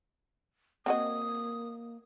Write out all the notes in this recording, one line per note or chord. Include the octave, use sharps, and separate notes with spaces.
A#3 C4 F#4 D#5 D#6